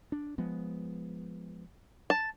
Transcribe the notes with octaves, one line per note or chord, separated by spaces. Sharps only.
D4
F3 G#3 B3
A5